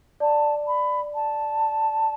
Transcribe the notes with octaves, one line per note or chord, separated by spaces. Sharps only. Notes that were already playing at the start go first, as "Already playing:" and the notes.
D5 A5
B5
A5